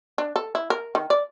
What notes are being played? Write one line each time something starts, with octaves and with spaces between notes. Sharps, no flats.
D4
A4
E4
A#4
D#3
D5